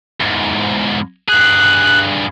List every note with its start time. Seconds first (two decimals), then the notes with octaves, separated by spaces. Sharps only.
0.20 E2 G#2
1.28 G2 G#4 F#6